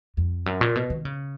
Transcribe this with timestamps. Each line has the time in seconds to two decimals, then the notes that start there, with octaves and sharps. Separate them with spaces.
0.17 F2
0.46 F#2
0.61 A#2
0.75 B2
0.90 D#3
1.05 C#3